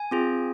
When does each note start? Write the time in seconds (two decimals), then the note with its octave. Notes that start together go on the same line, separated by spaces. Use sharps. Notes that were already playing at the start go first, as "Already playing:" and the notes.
Already playing: G#5
0.11 C4 F4 G#4